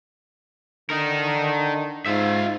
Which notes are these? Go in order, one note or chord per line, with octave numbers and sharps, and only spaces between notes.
D3 D#4 A#4
G#2 F4 E5